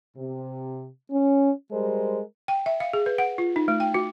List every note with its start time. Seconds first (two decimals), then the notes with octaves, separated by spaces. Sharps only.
0.16 C3
1.11 C#4
1.70 G3 G#3 A#4 C5
2.48 G5
2.66 E5
2.80 F5
2.93 G#4
3.06 B4
3.18 F#5
3.38 F4
3.56 D#4
3.68 A3
3.80 G5
3.94 F#4